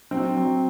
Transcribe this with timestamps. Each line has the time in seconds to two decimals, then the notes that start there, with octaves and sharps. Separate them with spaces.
0.11 F#3 C4
0.37 F#3